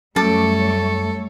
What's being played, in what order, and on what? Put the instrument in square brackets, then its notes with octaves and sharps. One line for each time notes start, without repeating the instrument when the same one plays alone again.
[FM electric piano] F#2 [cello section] G3 A3 C#5 [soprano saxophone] A4 [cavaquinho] A5 D6